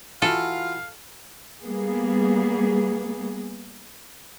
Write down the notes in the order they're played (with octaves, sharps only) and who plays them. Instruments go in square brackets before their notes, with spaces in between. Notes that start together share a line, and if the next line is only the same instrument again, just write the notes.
[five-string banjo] E3 F#4 [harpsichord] F4 [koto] A4 [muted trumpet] F5
[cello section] G3 A#3 B3 G#4